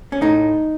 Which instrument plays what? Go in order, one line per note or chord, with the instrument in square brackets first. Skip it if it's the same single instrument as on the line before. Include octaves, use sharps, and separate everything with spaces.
[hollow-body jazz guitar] C#4
A2 D#4